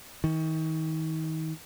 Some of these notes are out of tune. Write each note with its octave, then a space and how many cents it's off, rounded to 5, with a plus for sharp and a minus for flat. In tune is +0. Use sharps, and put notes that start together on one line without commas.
D#3 +35